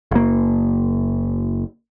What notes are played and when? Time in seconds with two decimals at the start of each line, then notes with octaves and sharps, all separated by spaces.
0.11 F#1 A#3